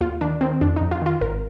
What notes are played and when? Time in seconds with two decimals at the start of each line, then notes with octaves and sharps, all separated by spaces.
0.01 D#2 F4
0.21 D#3 D4
0.41 D#3 C4
0.61 F2 D4
0.76 F2 D#4
0.91 F4
1.02 D#3 F4
1.21 G#1 A#4